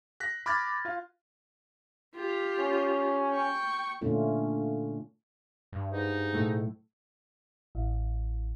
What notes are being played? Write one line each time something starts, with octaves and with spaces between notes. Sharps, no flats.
F#6 A#6 B6
B5 D6 F6 F#6 G#6 A6
F4 F5
F4 G4
C#4
G5 C#6
A#2 D3 A3 C#4 D4 F4
G2
G#2 D#4
B1 A2 A3
A1